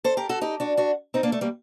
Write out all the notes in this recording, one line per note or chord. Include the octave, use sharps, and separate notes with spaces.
A4 C5
G4 A#4
F#4 A4
D#4 G4
D4 F#4
D4 F#4
C4 D#4
A#3 D4
A3
G3 A#3